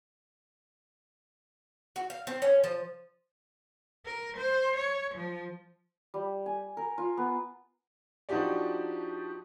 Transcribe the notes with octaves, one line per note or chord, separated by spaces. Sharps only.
F#4
F5
C4
C#4
F3
A#4
C5
C#5
F3
G3
G#5
A#4
F4
B3
F3 D4 D#4 F#4 G4 D5